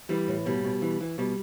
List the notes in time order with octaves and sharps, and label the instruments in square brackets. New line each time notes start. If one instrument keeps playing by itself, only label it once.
[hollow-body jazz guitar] E3 G3
A2
B2 G3
B2
E3
E3
B2 G3